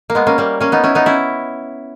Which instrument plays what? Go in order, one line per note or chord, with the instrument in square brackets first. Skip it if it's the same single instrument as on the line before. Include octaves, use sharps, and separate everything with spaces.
[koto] A#3
G#3 B3
A#3 C#4
G3 A#3
A#3 C#4
B3 D#4
C#4 E4
B3 D#4
C#4 E4